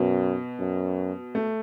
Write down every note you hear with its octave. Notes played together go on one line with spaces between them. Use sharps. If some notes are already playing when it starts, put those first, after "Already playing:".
Already playing: F#2 B2
F#2
A3